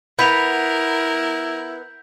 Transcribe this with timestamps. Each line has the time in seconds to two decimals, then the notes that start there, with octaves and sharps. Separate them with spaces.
0.19 B3 E4 A#4 G6 B6 F7